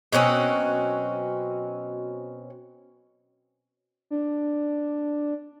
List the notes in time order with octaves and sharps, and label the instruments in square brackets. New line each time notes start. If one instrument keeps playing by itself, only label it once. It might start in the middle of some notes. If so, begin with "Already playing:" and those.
[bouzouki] B2 F#3 C4 C#4
[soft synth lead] D4